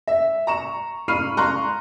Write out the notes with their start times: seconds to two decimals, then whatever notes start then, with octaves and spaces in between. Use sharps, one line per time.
0.07 E5
0.47 A#5 C#6 E7
1.08 B5 C#6 F6 C7 D#7
1.37 A#5 C6 C#6 F#6